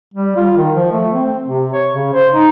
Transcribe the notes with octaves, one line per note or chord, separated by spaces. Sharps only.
G3
F4
D#3
F3
A3
C4
C3
C#5
C#3
C5
D#4